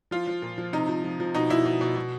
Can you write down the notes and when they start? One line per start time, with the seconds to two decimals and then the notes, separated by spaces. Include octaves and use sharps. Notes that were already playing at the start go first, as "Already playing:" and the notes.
0.11 F3 F4
0.27 F3
0.42 A#2
0.58 F3
0.73 C3 D#4
0.89 F3
1.04 F3
1.20 F3
1.34 B2 D#4
1.50 B2 E4
1.66 B2
1.81 B2
1.96 B2